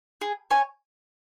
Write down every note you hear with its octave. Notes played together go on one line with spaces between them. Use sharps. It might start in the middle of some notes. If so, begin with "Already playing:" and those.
G#4
C#5 G#5